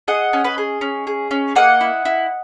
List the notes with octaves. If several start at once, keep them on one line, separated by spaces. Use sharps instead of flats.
G#4 D#5 F#5
C#4
B4 D#5
G#4
C#4
G#4
C#4
A#3 D#5 F#5
E4
E4